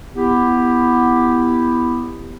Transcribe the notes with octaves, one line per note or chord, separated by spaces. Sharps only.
B3 E4 G4